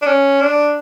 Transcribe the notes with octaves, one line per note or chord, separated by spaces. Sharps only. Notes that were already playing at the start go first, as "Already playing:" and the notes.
D4
C#4
D4